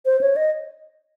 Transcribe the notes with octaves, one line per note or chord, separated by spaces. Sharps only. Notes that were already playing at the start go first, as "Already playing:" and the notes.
C5
C#5
D#5